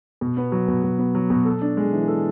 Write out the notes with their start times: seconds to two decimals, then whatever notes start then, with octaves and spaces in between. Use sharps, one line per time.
0.21 B2
0.37 B3
0.52 F#3
0.68 B2
0.83 B2
0.99 B3
1.15 F#3
1.30 B2
1.45 A4
1.62 D4
1.77 G#3
1.92 E3
2.08 A4